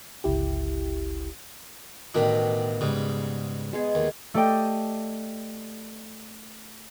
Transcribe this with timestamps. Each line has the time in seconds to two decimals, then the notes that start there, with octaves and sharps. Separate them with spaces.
0.24 G1 C#2 E4 G4
2.14 A1 B2 D#3 D4 E5 B5
2.81 G#2 C#3 G3
3.73 G#3 B3 G#4
3.95 D#2
4.34 A3 G4 D5 D#5 G5